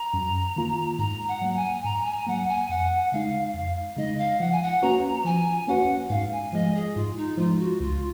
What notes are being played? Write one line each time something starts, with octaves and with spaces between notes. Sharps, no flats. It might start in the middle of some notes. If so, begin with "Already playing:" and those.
Already playing: A#5
F#2
D#3 A#3 F4
G#2 A#5
F#5
F#3 A#3
G#5
G#2 A#5
G#5
F#3 A#3 F#5
G#5
F2 F#5
C#3 G#3 D#4 F5
F2 F5
C#3 G#3 D#4 D#5
F5
F3 F#5
G#5
F#5
A#3 C#4 F#4 B4 A#5
F3 G#5
A#3 C#4 F#4 B4 F#5
G#2 F5
G#5
F3 G#3 D#5
G#4
G#2 F4
D#4
F3 G#3 F4
F#4
C#2 F4